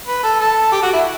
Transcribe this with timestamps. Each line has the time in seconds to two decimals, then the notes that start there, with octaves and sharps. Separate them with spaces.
0.07 B4
0.23 A4
0.39 A4
0.72 G4
0.82 F#4
0.93 E4